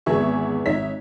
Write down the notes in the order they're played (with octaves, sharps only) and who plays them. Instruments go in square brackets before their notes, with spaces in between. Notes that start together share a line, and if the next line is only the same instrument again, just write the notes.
[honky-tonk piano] G#1 E2 B3 G#4 E5 C#6
G#1 D#4 C#5 E5 B6